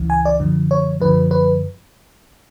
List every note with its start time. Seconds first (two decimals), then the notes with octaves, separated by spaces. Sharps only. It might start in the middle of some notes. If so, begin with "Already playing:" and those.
Already playing: C#2 C#3 E3
0.10 G#5
0.25 D5
0.40 F#2 D3 F3
0.71 C#5
1.01 F#2 D3 F3 B4
1.31 B4